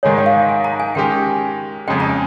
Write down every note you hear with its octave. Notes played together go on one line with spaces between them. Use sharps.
G#2 D#3 G#3 D#4 G#4 C#5
G5
F5
G#5
A#5
G#5
D#3 G#3 C#4 G4 G5
F2 C#3 G#3 G5
A#5
G#5